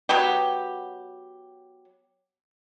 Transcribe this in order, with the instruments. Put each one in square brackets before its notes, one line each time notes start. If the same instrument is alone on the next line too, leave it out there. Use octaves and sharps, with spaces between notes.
[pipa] F#3 B3 F#4 G4